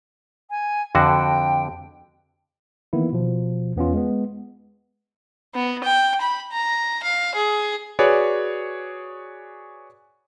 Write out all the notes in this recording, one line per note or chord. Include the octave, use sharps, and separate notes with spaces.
G#5
F2 D3 F#4 G5
D#3 E3 A#3 B3 E4
B2 F3
E2 B3 C#4 F4
G#3 B3
B3
G5
B5
A#5
F5
G#4
F#4 G#4 B4 C#5 D5 F#6